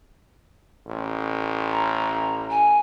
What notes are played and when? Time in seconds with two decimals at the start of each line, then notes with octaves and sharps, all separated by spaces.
0.86 A1
1.71 A#5
2.50 G#5